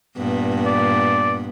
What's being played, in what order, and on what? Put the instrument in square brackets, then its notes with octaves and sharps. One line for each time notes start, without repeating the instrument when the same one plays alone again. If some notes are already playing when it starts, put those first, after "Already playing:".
[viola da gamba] G2 A#2 B3
[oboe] D5